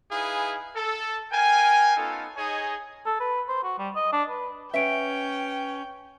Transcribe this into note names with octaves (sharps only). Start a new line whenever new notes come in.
D#4 E4 G#4 B4 F5 G#5
A4
A#4 F5 G5 G#5
B3 C#4 D#4 F4 A4
D#4 G#4 C#5 D#5 G#5
A4
B4
C5
F#4
G3
D#5
D4
B4
C#4 B4 E5 F#5 G5 D7